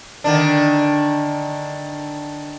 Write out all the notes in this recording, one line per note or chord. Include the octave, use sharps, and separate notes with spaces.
D3 D#3 D4